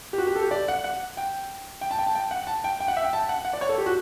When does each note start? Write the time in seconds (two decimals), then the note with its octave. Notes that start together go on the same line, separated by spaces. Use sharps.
0.13 G4
0.18 F#4
0.27 G4
0.36 A4
0.43 G4
0.51 D5
0.68 F#5
0.84 F#5
1.17 G5
1.81 G5
1.91 A5
1.99 G5
2.07 A5
2.15 G5
2.31 F#5
2.47 A5
2.64 G5
2.80 G5
2.88 F#5
2.97 E5
3.04 G5
3.13 A5
3.29 F#5
3.45 F#5
3.53 D5
3.61 C#5
3.69 A4
3.78 G4
3.86 F#4